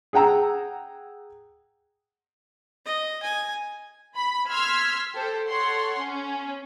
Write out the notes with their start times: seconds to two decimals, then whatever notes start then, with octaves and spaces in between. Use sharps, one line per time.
0.13 G#4 F#5 G5 A#5 E6
2.85 D#5
3.22 G#5
4.16 B5
4.49 C6 E6 F6 G#6 B6
5.14 G4 A4 C5
5.48 A4 C#5 F#5 C6
6.00 C#4